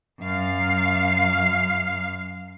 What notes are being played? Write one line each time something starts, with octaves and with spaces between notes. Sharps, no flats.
F#2 F5